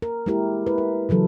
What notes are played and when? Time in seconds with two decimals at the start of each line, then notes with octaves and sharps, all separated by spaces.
0.02 A#4
0.26 G#3 A#3 E4 G4 A#4
0.66 E4 B4
0.78 A#4
1.09 C#3 E3 F#3 A4